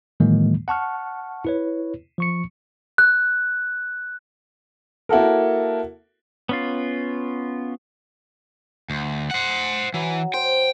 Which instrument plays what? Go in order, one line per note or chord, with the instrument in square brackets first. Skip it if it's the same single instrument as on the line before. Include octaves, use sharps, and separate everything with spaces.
[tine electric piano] A2 D#3 E3 F#3 G#3 A#3
F#5 A5 C#6 F6
E4 B4 C#5
F3 C#6 C#7
[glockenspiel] F#6
[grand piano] A#3 E4 F#4 A4 A#4
[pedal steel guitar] B3 C#4 F4
[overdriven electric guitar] D2
C5 F#5
[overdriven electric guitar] E3 [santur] F#3
[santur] C5 [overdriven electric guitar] G5